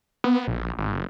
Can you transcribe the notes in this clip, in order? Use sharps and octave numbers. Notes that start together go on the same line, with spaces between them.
B3
A#1
G#1
F#1